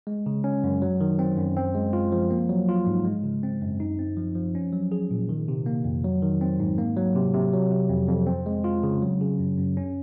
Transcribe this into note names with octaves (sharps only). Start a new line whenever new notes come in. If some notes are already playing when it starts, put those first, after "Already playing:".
G#3
C#3
C#4
F#2
F#3
D#3
C4
F#2
C4
G#3
F4
F3
A#3
F#3
F4
G#2
G#3
C#3
C4
F#2
D#4
C4
F3
F3
C#4
F#3
G#4
A#2
D#3
C3
A#3
F2
F#3
D#3
C4
G#2
A#3
F#3
C3
C3
F#3
C3
F2
F2
C4
G#3
F4
C#3
F#3
C#3
F#2
F#2
C#4